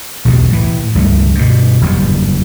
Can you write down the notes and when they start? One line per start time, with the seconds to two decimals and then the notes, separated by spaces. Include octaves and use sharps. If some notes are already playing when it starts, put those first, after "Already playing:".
0.25 B1 E2 A2 C3
0.50 A2 E3
0.95 C#2 G2 F3 A3
1.35 G2 B2
1.81 F#1 E2 G2